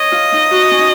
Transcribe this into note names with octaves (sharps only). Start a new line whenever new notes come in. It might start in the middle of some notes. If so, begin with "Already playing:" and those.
Already playing: C#5 D#5
F4
D#4
F#4
C#4
D#4